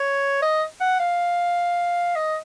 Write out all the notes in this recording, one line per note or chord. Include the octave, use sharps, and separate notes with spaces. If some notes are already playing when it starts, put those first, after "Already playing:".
Already playing: C#5
D#5
F#5
F5
D#5